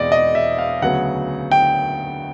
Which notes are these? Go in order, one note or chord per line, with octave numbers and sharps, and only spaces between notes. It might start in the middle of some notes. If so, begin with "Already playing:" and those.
Already playing: E2 B2 G#3 C4 D5 D#5
D#5
E5
F5
D2 C#3 F#3 B3 F#5
G5